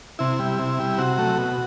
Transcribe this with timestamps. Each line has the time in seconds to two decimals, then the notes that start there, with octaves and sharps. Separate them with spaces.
0.19 C3 E4
0.39 G3
0.59 C3
0.79 G3
0.98 C3 F#4
1.18 F#3 A3
1.37 B2